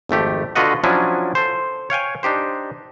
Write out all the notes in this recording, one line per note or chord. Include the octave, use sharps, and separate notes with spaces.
G#1 F2 A3 G4
D3 F4 F#4 B4 D#5 F#5
F3 F#3 C#4 D4 E4 G#5
A4 C5
C#5 F5 G5 G#5
D4 D#4 G4 C5